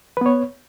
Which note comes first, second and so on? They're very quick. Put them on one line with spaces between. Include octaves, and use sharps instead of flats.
B4 B3 C#5